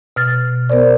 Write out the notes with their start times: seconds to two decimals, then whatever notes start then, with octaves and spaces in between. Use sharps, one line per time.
0.16 B2 F6 A6
0.70 B3 A#4 C5 D5